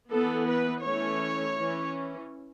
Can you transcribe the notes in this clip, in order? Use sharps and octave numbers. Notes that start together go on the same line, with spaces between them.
E3 B3 A4
B4
E3 A3 C#4 C#5
E3 C#4